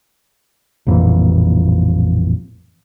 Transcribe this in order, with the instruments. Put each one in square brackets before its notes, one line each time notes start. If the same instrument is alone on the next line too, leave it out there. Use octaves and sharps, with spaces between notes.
[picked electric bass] A1 F2 A#2 E3